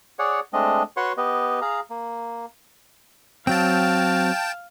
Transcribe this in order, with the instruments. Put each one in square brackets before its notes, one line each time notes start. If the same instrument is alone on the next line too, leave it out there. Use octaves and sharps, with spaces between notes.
[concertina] G#4 C#5 D5 F#5
G#3 A3 C4 D4 D#5
F#4 B4 C#5 F#5 C6 C#6
B3 G4 B4 D#5
G#4 F5 A#5
A#3
[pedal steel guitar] F#3 C4 [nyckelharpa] F5 [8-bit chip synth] G5 A5